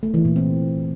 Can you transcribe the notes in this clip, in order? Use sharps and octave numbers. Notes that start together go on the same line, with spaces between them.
A3
E3
A#2
C4